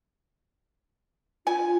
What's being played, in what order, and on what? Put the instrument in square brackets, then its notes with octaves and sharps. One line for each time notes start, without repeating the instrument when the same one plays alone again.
[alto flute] F4 [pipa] G#5